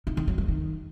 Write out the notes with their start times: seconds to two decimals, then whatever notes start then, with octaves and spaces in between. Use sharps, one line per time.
0.07 D#3
0.17 D#3
0.27 F#3
0.38 F#3
0.48 D#3